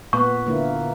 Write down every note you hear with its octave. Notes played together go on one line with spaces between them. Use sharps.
A#2 B3 B4 C#6
D3 A#3 E4